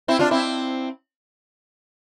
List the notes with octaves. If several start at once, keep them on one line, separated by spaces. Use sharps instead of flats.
C4 E4
D4 F4
C4 E4